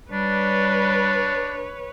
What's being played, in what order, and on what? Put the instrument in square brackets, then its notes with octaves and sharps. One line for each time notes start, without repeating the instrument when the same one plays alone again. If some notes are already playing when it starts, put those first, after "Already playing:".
[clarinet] G3 [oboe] D4 [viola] B4 C#5